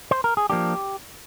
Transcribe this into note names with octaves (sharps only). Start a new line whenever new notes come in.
C5
A#4
G#4
F3 A#3 D4 G4